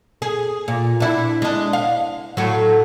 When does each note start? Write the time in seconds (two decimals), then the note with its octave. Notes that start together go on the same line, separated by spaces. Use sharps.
0.22 G#4
0.68 A#2
1.00 D4 E4
1.42 G#3 D4
1.73 F5
2.37 A2 F#3